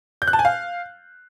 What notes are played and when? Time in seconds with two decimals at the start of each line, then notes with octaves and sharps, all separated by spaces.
0.22 G6
0.27 F#6
0.33 A5
0.39 G#5
0.45 F5